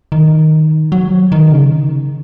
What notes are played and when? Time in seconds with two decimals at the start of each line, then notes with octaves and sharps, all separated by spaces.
0.12 D#3
0.92 F#3
1.32 D#3
1.52 C#3